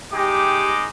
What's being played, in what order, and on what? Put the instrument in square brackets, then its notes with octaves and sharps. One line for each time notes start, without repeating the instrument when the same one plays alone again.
[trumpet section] G#3 D#4 D6 [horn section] G4